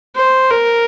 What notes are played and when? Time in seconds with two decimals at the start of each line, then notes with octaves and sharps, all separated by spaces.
0.16 C5
0.50 A#4